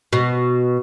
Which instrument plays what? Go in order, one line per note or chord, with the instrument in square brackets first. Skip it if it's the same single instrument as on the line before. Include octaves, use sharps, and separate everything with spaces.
[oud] B2